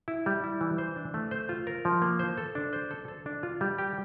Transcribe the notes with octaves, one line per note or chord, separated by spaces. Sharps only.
E4
G3
E4
E3
C5
D4
A3
C5
F4
A#4
F3
A#3
C5
A4
D4
C5
A4
A4
D4
F4
G3
G4